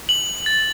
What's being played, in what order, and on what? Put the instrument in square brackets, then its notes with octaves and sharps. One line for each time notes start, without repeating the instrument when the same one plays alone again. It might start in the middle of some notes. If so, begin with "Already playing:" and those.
[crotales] F#7
A6